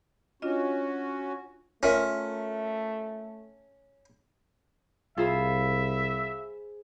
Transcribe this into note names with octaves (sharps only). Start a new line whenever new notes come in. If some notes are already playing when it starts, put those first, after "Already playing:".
C#4 D4 F4 F#4 D#5
A3 C#4 F4 A#4 E5
C2 F4 G#4 C5 E5 B5